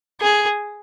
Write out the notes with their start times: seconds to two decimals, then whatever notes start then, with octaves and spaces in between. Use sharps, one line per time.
0.22 G#4